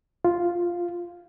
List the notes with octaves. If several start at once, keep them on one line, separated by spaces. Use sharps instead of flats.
F4